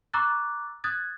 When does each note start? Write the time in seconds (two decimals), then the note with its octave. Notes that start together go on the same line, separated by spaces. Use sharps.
0.14 A#5 C#6 D6 E6 F#6 A6
0.84 D#6 F#6 G#6 A6